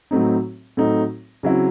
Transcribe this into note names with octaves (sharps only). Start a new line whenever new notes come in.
A2 F#3 A3 C4 D#4
A2 F#3 A3 C4 D#4
C#3 F#3 C4 E4